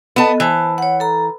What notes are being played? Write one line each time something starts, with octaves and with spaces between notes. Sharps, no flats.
B3 A4 D#5 A5
E3 C5 A5
C#5 F#5
A4 A#5